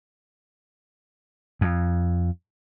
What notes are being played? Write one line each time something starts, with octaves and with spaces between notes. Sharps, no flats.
F2